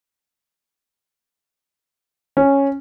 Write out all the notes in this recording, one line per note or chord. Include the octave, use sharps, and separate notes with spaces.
C#4